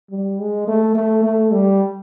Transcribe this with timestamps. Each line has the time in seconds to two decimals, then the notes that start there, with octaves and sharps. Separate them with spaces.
0.11 G3
0.39 G#3
0.67 A3
0.95 A3
1.23 A3
1.51 G3